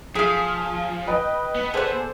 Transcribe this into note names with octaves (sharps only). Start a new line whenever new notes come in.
F3 G#4 F5 D#6 B6 D7
B4 D#5 G5
B3
G#4 A4 C5 D5 F#5